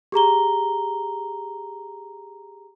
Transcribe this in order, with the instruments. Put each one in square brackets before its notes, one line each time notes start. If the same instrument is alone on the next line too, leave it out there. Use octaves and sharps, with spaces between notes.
[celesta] G4 G#4 A#5 G7